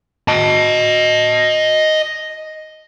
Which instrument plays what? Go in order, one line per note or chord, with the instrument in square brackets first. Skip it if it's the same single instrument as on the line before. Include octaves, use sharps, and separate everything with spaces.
[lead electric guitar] D#5 A5